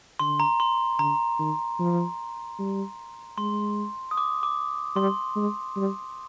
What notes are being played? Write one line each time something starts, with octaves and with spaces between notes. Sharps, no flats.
D3 C6
A#5
C6
D3 A#5
D#3
F3
G3
G#3 C6
D#6
D6
D6
G3 C6
G#3
G3